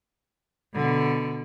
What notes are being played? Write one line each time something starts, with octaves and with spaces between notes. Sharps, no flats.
B2 D3